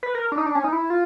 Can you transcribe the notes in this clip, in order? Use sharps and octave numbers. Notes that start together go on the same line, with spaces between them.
B4
A#4
D4
D#4
D4
C#4
D#4
E4
F4